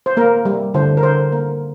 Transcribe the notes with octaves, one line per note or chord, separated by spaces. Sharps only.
C5
A#3 A#4
G3
D3 C5
A#4
D3 C5
A#3 A#4